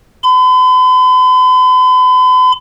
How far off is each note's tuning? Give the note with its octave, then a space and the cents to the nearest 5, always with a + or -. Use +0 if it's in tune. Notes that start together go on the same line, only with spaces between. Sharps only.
B5 +45